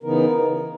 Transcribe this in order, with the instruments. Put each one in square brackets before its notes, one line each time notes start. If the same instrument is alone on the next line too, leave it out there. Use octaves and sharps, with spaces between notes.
[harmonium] C#3 E3 B3 D#4 A#4